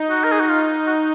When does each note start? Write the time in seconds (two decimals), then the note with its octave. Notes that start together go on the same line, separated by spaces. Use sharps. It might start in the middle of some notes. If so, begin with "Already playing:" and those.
Already playing: D#4
0.10 F#4
0.24 A#4
0.32 G#4
0.40 F#4
0.49 F4
0.87 F#4